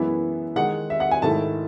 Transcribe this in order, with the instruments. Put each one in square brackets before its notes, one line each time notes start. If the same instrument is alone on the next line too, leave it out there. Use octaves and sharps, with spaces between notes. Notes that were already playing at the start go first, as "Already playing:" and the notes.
Already playing: [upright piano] F#2 E3 G#3 B3 E4 E5
D#3 G#3 D#4 F#5
E5
F#5
G#5
G#2 D#3 A3 E4 A5